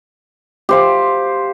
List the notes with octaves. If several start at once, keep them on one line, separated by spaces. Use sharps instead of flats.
G4 C5 F5